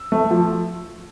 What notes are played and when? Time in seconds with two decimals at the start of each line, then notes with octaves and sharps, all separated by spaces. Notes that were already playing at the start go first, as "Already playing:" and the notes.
Already playing: E6
0.12 A3
0.31 F3